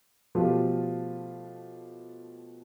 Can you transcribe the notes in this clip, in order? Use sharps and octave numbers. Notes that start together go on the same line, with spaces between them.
B2 F3 A3 F4 G4